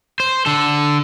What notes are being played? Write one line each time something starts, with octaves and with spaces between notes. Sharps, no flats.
C5
D3 A4